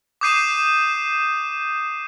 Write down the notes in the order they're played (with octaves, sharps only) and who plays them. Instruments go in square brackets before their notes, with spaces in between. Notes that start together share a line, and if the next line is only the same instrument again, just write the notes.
[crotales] D6 D#6 G6 C7 D#7 E7